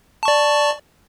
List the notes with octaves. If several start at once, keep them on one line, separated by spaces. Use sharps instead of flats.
D5 A5 C#6